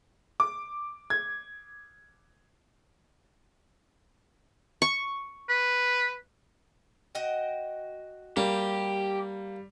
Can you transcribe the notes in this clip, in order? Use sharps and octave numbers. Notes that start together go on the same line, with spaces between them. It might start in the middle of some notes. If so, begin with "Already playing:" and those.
D6
G#6
C#6
B4
F#4 D#5 G5
G3 A#3 G4